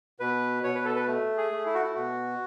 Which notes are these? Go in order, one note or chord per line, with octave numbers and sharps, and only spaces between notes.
B2 B4
B2 C#5
B4
A4
B4
A3
G#4
A3
E4
F#4
E4
B2 F#4